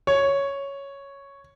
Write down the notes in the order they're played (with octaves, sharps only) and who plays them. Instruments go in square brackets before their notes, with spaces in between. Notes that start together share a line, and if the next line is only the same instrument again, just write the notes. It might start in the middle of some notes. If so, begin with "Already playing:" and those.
[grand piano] C#5